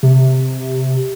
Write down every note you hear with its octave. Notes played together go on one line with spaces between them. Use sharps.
C3